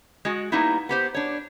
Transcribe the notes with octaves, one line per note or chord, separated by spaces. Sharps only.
G#3 F#4
G3 A#3 B3 D#4 E4
B3 G4 C5
D4 C#5